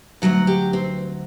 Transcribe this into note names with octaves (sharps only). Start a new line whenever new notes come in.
D2 C3 F#3 F#5
G4
C4